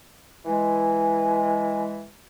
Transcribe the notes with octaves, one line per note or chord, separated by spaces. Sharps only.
E3 G#3 G#5